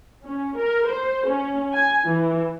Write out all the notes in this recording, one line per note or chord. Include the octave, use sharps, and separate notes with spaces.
C#4
A#4
C5
C#4
G#5
E3